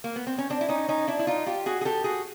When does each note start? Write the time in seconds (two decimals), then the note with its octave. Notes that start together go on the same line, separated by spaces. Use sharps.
0.04 A#3
0.16 B3
0.27 C4
0.38 C#4
0.50 C4 D4
0.61 E4
0.69 C#4 D#4
0.88 C#4 D#4
1.08 D4 E4
1.19 E4
1.27 D#4 F4
1.46 F4 G4
1.66 F#4 G#4
1.81 G#4
1.85 G4 A4
2.04 F#4 G#4